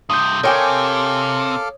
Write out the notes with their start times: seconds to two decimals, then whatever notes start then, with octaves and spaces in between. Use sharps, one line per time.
0.09 G2 C3 D#6 G6
0.43 C3 A4 A#4 C#5 F5 G5 G#5 D6